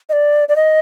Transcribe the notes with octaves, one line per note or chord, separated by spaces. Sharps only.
D#5
D5
D5
D#5